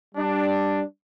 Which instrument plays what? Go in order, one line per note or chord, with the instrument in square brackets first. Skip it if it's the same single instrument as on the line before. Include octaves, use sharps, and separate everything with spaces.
[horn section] G3 D4